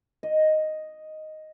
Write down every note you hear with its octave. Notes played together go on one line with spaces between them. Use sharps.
D#5